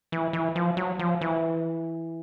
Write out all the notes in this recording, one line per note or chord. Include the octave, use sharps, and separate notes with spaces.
E3
E3
F3
F#3
F3
E3